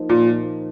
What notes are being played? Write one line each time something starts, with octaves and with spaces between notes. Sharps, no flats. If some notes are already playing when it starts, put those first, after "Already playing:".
Already playing: F3 A#3 D#4
A#2